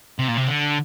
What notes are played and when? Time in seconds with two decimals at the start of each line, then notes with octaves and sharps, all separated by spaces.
0.19 C3
0.28 A#2
0.37 C3
0.48 D3